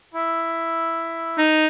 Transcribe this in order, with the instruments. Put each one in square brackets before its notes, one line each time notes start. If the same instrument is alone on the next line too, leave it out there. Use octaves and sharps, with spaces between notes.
[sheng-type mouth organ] E4
[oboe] D#4